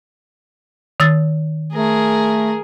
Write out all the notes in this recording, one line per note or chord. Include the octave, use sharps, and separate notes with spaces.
D#3 E6 A6
A3 G#4 A#4